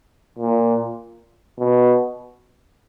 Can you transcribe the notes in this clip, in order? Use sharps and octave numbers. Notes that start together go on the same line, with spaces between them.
A#2
B2